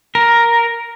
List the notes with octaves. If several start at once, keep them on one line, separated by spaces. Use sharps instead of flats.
A#4